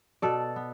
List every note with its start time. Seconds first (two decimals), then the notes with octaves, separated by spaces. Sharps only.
0.22 B2 A4 D5
0.56 B3